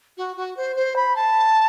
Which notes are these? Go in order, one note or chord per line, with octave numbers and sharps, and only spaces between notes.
F#4
F#4
C5
C5
B5
A5